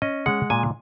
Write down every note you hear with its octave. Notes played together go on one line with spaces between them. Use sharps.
C#4 D#5
G#3 F#5
A#2 G#5